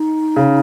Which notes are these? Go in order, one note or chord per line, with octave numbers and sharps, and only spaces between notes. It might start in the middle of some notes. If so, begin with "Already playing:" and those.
Already playing: D#4
C#3